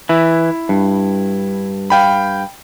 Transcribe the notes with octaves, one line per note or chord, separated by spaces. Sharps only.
E3 E4
G2
F5 G5 B5